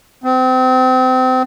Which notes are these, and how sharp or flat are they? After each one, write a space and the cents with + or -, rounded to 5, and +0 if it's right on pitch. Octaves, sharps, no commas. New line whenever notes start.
C4 -30